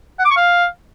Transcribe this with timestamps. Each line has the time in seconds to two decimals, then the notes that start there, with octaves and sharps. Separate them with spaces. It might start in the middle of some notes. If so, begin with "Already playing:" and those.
0.19 F#5
0.25 D6
0.31 C#6
0.36 F5